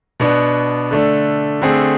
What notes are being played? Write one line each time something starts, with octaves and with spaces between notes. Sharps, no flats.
B2 B3 D4
D3 A3 D4
D3 A3 C4 G#4